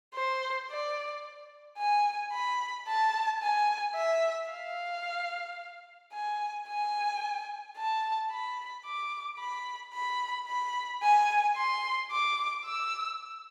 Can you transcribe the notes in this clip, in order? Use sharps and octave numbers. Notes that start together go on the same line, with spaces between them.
C5
D5
G#5
B5
A5
G#5
E5
F5
G#5
G#5
A5
B5
D6
B5
B5
B5
G#5
C6
D6
E6